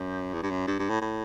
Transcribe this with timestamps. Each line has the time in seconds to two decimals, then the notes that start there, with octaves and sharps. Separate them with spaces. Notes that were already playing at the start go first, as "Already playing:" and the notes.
Already playing: F#2
0.34 E2
0.43 G2
0.51 F#2
0.67 G2
0.79 G2
0.90 A2
1.01 A2